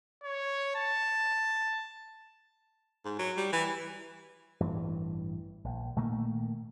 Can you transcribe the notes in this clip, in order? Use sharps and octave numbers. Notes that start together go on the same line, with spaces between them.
C#5
A5
G#2
F#3
G3
E3
A1 G2 E3
A#1
A#2 D#3 A3 A#3